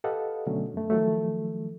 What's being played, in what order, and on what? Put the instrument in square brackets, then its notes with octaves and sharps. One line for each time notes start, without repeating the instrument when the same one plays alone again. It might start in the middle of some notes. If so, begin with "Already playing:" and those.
[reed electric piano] G4 A4 B4 D#5 F5 F#5
B2 D3 F#3 A3 C#4
F#2 A3
D#3 F3 F#3 A3